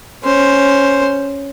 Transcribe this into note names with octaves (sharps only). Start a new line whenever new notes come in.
C#4 C5